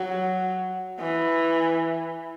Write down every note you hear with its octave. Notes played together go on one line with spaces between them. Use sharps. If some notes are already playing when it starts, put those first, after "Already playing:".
Already playing: F#3
E3